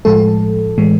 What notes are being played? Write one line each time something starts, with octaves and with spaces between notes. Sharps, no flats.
A2 F3 G#3 A4
A2 E3 G#3